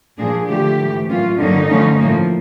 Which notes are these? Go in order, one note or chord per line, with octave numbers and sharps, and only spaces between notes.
A#2 F3 A#3 D4 G#4
D3 F3 A3 G4
G#2 E3 A3
A2 F#3 A#3 C#4 F4
G2 D3 F#3 A#3 C#4 D#4
D3 F3 A3 C#4
A2 F3 A#3